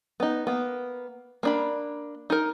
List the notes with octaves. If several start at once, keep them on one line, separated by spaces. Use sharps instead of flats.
B3 D#4
A#3 B3
A#3 D4 B5
D#4 A#4